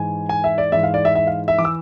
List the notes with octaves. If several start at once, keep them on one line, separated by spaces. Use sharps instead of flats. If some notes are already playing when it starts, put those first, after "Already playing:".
Already playing: G#2 E3 G#5
G#5
E5
D5
G#2 E3 E5
F5
D5
E5
E5
F5
E5
E3 D6
E6